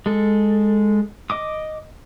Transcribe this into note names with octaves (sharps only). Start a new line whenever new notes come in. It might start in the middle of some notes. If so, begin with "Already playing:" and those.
G#3 A4
D#5 D6 D#6